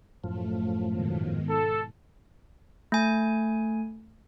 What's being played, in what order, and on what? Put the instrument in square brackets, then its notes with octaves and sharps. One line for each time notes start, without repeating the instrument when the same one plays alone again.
[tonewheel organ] F#2 A2 F3 [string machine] A3
[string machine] G#2 B2 D#3
[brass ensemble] A4
[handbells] A3 G#5